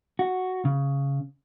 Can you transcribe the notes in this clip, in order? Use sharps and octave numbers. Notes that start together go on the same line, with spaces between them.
F#4
C#3